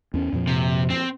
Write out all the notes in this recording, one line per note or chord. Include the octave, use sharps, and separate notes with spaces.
E2 C#4
F2 A#2 F3
C3
C4